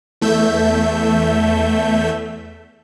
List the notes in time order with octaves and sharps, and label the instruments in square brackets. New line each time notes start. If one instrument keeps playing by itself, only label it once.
[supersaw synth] E2 A3 E5 G6